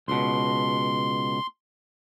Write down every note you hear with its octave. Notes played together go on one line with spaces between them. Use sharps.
C#2 B2 C6